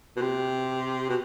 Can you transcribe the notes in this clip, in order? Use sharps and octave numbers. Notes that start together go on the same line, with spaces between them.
B2
C3
B2